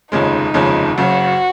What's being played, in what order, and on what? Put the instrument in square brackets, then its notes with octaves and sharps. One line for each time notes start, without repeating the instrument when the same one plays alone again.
[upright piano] F1 D#2 C#3 F3 G#3 [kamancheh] D#4
[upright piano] F1 D#2 C#3 F3 G#3
[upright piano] F#1 F#2 C#3 [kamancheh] F#4